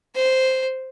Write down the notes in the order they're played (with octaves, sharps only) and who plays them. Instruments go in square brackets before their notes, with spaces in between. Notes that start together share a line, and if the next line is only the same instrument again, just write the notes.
[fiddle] C5